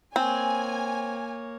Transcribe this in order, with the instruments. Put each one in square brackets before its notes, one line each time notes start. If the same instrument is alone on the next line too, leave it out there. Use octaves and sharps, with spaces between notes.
[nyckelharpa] A#3 C#5 [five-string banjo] C4 [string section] G#5